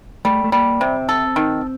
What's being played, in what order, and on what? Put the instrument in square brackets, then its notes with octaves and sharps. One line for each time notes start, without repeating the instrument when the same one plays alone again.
[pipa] G3 [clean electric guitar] A3
[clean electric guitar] A3
[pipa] G3 [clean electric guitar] A#3
[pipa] C3 [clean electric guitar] C4
[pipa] A4
D#3